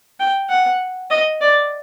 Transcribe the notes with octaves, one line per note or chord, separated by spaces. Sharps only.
G5
F#5
D#5
D5